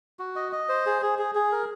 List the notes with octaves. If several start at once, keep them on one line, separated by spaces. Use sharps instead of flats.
F#4
D#5
D#5
C5
G#4
G#4
G#4
G#4
A#4